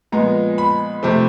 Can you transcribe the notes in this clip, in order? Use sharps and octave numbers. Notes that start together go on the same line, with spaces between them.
A#2 F3 G#3 B3 A#5
B5
C3 F3 A3 C4